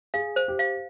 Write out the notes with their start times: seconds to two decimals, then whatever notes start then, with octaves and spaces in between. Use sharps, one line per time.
0.14 G#4 F5
0.36 C5
0.48 G4
0.59 F5